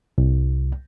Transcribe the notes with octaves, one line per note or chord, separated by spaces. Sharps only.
C2